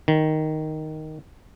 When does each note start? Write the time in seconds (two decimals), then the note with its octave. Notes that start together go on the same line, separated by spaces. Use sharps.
0.08 D#3